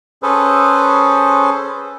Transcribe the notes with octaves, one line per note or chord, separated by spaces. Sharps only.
C#4 G#4 A4 B4 C5